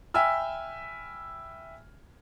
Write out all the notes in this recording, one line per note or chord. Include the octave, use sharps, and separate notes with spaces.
E5 G5 G#5 B5 E6 F6